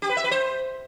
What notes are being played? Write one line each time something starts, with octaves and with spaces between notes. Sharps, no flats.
G4
B4
E5
B4
C5